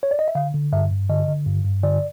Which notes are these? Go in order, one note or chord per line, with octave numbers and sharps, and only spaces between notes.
C#5
D5
D#5
E5
D3 F5
D3
G2 E5
G2
D3 D#5
D3
G2
G2
D3 D5